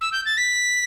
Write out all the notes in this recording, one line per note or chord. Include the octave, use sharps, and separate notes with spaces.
E6
G6
A6
B6